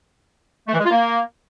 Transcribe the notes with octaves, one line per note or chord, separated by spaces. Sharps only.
A3
E3
G#3
F4
A#3